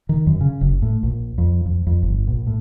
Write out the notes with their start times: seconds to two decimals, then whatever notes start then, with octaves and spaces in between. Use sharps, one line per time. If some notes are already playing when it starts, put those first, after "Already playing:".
0.09 D#3
0.27 F#2
0.41 C#3
0.61 F#1
0.82 A2
1.03 A#1
1.38 F2
1.66 F2
1.87 F2
2.03 G1
2.27 A#1
2.47 A2